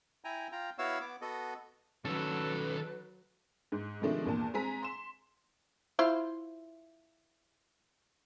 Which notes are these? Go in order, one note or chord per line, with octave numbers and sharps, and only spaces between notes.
E4 G5 G#5 A#5
F4 G5 A#5
B3 E4 F#4 C#5 F5 E6
B3 D6
B3 F#4 A4 D#5
D#3 F#3 C#4 A4 B4
G#2
C3 D#3 F3 G#3 A3 D4
E2 A#2 A5
G#3 C4 G#5 A#5 B6
C6 E7
E4 F4 C5